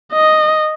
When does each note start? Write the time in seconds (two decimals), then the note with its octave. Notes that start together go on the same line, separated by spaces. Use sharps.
0.13 D#5